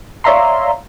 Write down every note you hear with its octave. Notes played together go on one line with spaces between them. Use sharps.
C#5 D5 E5 F5 A#5 C6